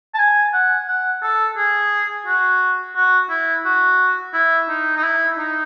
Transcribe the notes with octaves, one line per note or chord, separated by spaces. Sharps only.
A5
G#5
F#5
F#5
A4
G#4
F#4
F#4
E4
F#4
E4
D#4
D#4
E4
D#4